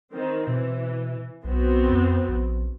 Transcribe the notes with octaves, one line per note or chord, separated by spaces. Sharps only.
D#3 C4
B2 E3
B1 B3 C4 F#4
F2
A#1